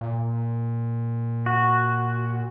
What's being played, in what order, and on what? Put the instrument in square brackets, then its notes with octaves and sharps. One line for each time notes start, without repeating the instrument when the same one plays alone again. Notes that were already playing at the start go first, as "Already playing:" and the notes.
[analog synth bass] A#2
[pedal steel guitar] F#4